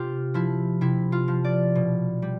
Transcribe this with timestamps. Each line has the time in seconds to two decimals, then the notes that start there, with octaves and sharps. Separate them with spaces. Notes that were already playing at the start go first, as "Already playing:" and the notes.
Already playing: C3 F4 G4
0.34 F3 E4
0.81 C3 E4
1.12 F4
1.28 F3
1.44 D5
1.75 B2
2.22 G3